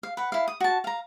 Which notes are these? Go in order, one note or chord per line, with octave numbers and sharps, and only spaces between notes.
F5
B4 F#5
E4 F5
D#6
F#4 A5
F5 A#5